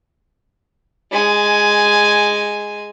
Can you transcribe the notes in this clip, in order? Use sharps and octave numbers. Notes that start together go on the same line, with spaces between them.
G#3 G#5